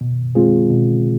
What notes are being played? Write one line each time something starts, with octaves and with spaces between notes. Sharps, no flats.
B2
G#3 C4 F4 G#4
B2